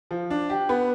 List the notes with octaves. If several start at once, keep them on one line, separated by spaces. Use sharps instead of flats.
F3
D4
G4
B3